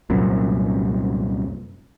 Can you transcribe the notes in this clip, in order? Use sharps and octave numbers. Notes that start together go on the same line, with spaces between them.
C2 F#2 A#2